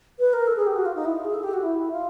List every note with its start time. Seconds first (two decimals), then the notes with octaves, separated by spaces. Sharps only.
0.19 B4
0.33 A#4
0.47 A4
0.57 G#4
0.67 G4
0.76 F#4
0.86 F4
0.96 D#4
1.05 E4
1.15 F4
1.25 G#4
1.34 A4
1.43 G4
1.53 F#4
1.63 E4
1.92 F4